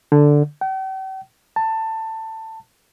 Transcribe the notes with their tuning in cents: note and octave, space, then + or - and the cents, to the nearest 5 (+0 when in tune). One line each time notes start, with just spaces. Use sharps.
D3 +0
G5 -45
A5 +20